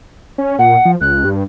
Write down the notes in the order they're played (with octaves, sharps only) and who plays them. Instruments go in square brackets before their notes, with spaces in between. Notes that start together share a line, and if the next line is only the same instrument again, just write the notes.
[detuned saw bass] C#4
[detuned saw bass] A#2 [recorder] F#5
[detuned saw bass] F3
[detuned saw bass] C#2 [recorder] F#6
[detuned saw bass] G2